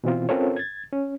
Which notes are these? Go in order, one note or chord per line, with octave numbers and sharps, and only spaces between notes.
B2 E3 C4 F4
C4 C#4 F4 A4 A#4 C#5
G#6 A6
C#4